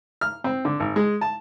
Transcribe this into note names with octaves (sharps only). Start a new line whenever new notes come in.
F6
C4
D3
G#1
G#3
A5